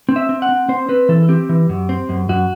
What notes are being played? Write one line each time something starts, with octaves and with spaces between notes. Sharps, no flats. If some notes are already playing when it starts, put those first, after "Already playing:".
C4
E5
C4
F#5
C4
C4 C5
C4 B4
E3 A4
A4
C4 G4
E3
F#2
C4
F#2
F#2 F#4